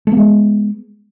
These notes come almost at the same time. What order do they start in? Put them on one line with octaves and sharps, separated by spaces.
A3 B3 G#3